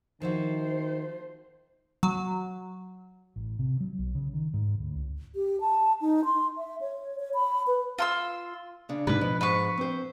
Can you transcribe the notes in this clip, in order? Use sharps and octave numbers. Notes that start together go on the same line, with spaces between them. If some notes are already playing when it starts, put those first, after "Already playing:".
D#3 F3 E4 F#4 C5
F#3
A1
C3
F#3
B1
C#3
D#3
G#2
D2
C#2
G4
A5
D#4
C6
E5
C#5
C#5
B5
B4
F4 C6 E6
C#3 D4
G#2 C3 B4
B2 F3
G#2 B4 C#6
C4 C5